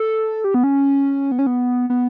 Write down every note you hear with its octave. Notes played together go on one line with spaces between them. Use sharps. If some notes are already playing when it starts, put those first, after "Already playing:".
Already playing: A4
G4
B3
C#4
B3
C#4
B3
B3